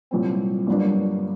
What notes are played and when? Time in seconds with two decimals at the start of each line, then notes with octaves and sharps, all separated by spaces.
0.11 C2 A#2 F#3 C4
0.67 G1 G2 F#3 A#3 D4